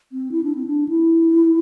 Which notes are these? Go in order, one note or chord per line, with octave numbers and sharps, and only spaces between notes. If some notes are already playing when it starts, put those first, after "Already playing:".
C4
E4
D4
C4
D4
E4